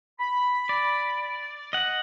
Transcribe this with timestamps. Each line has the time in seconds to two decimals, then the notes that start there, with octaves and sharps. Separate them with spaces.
0.20 B5
0.69 D5
1.73 D#5 F#5